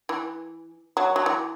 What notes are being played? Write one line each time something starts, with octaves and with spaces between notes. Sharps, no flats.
E3
F#3
F#3
E3